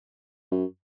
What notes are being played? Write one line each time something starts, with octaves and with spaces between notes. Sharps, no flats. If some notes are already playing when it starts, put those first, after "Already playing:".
F#2